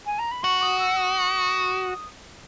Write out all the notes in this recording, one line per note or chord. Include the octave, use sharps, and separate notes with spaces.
G#5
A#5
B5
F#4 C#6
D#6
E6
D#6